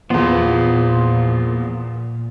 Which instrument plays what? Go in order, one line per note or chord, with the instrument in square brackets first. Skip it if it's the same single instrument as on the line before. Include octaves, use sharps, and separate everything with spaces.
[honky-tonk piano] E2 B3 [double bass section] A#2 [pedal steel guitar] F3 F4